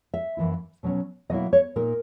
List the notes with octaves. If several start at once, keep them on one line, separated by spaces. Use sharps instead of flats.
E5
F#2 E3 A#3 E4
B2 F#3 C#4
B2 F#3 A#3 E4 D#5
C#5
A#2 A#3 D#4 A#4